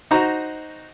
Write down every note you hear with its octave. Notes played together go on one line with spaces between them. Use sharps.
D#4 F#4 C5 A#5